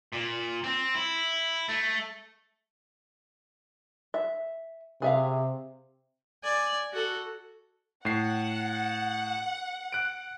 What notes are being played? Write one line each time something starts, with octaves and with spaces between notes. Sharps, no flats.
A#2
C4
E4
A3
E5
C3 G#4 E5 F5
D5 G#5
F#4 A4
A2 F#5 C7
F#6 D7